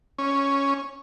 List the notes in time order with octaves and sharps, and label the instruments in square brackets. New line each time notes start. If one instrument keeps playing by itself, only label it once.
[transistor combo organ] C#4